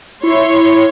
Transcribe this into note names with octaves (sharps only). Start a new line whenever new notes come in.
E4 C#5 C6